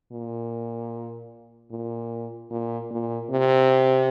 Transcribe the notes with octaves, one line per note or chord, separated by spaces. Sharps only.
A#2
A#2
A#2
A#2
C3